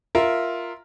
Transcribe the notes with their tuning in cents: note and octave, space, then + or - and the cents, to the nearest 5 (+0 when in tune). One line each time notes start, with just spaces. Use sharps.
F4 +0 A#4 +0 E5 -5